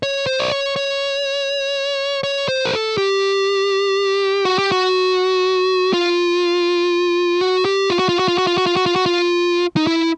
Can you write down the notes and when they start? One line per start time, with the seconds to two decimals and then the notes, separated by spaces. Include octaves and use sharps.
0.03 C#5
0.26 C5
0.39 D5
0.51 C#5
0.76 C#5
2.24 C#5
2.48 C5
2.65 A#4
2.73 A4
2.98 G4
4.45 F#4
4.58 G4
4.72 F#4
5.93 F4
7.41 F#4
7.65 G4
7.90 F4
7.99 F#4
8.09 F4
8.19 F#4
8.28 F4
8.38 F#4
8.47 F4
8.58 F#4
8.66 F4
8.76 F#4
8.86 F4
8.96 F#4
9.06 F4
9.76 D#4
9.87 E4